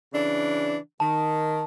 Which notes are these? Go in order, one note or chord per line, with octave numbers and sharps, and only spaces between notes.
C#3 E3 D4
D#3 A5